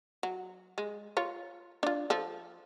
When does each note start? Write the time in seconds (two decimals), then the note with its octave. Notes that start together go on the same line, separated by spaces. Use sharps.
0.23 F#3
0.78 G#3
1.17 F4 C#5
1.83 D4 F4
2.10 F3 A4